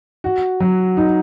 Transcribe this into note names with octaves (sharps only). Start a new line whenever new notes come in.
F#4
F#3
D#4